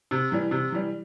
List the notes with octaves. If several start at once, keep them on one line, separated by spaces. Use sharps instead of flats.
C3
E3 G3
C3
E3 G3